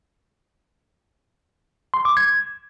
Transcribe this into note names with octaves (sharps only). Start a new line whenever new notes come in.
C6
D6
G#6